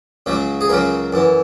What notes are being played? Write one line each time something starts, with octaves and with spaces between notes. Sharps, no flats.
C#2 C#3 F#3
G#4
C#2 C#3 F#3 A#4
F#2 E3